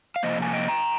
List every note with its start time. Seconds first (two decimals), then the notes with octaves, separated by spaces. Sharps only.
0.16 F5
0.23 C3 F3 A#3 C5 D#5
0.42 G#5
0.53 D#5 G5
0.68 G5 A#5